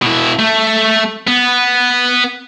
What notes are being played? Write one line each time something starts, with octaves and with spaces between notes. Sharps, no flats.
B2 E4
A3
B3